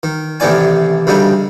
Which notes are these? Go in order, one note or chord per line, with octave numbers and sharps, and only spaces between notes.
D#3
A1 C3 D#3 D#4 D5 G#5
D2 C#3 G3 D#4